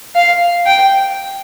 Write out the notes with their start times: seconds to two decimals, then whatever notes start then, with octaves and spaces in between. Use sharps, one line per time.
0.16 F5
0.66 G5